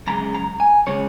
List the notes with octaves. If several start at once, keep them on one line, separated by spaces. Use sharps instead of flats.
F#2 C#3 G#3 A#5
A#5
G#5
C#3 G#3 C#5